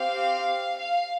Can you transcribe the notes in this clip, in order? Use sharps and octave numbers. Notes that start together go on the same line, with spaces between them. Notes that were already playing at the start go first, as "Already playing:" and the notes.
Already playing: C4 G4 F5
F5